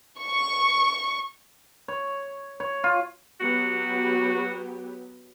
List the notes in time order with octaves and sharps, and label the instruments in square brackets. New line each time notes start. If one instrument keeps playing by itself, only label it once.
[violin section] C#6
[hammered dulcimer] C#5
C#5
F4
[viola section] F#3 B3 G4 [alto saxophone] F#4